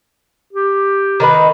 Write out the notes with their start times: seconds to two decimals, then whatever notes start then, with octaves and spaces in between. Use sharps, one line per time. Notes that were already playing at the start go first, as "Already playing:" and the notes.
0.53 G4
1.20 D#3 D#4 B4